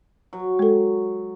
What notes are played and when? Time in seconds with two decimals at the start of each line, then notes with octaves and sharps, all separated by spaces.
0.33 F#3
0.59 G#3 A4